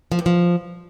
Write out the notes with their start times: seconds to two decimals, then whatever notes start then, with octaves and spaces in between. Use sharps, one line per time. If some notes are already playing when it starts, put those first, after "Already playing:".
0.12 F3
0.19 G2
0.26 F3